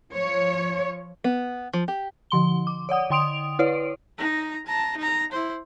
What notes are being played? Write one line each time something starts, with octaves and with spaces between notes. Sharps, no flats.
F3 C#5
B3
F3
G4
D3 F3 C6 G7
D6
C#5 D5 F#5 D#6
D3 G5 C6 D#6 D7 F7
E4 B4 C#5 D5
D#4 A#5
A5 A#5
D#4 A#5
E4 C5